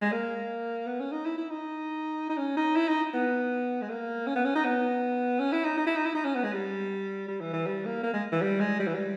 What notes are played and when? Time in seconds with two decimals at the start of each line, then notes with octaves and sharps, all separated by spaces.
0.02 G#3
0.12 A#3
0.87 B3
1.00 C#4
1.12 D#4
1.25 E4
1.37 E4
1.50 D#4
2.29 D#4
2.38 C#4
2.57 D#4
2.76 E4
2.88 D#4
3.14 B3
3.82 G#3
3.89 A#3
4.27 C#4
4.36 B3
4.45 C#4
4.55 D#4
4.65 B3
5.39 C#4
5.52 E4
5.64 D#4
5.77 D#4
5.86 E4
5.96 D#4
6.05 E4
6.14 D#4
6.25 C#4
6.35 B3
6.43 G#3
6.53 G3
7.28 G3
7.40 E3
7.53 E3
7.66 G3
7.85 A#3
8.03 A#3
8.14 G#3
8.32 E3
8.41 G3
8.60 G#3
8.80 G3
8.87 E3
8.95 G3